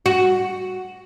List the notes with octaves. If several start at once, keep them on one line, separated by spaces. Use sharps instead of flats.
F#4